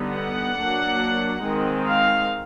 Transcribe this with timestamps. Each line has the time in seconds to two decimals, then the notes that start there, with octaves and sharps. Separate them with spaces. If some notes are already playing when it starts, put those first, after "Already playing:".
Already playing: D3 G3 B3 D#4
0.14 F#5
0.57 F#3 A#3 D4
1.43 D#3 G#3 C4 D#4
1.86 F5